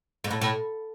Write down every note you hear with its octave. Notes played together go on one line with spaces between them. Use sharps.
G#2
A2
A2